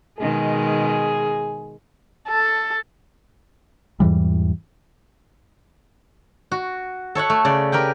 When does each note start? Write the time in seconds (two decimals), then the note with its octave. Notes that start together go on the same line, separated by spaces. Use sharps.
0.20 B2 D#3 G#3 G#4
2.28 A4
4.00 E2 G#2 E3 G3
6.52 F#4
7.15 A4 C#5 E5 F#5
7.30 A3
7.45 C#3 D5
7.72 G4 A#4 B4 G5